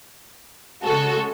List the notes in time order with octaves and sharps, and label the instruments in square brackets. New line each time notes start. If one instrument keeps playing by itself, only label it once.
[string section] C#3 G#3 F#4 A4